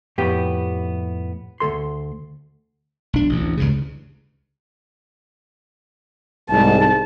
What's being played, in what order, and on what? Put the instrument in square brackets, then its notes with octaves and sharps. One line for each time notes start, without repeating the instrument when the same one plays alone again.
[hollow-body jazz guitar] F2 A2 B3 G4 G5
D2 C#3 A4 C6
[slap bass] B1 D4
A1 D2
C#2 G2 C#3
[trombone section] C2 G#2 [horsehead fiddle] A5